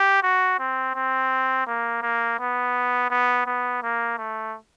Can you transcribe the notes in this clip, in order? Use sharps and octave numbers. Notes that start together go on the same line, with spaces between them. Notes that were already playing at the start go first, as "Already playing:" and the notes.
Already playing: G4
F#4
C4
C4
A#3
A#3
B3
B3
B3
A#3
A3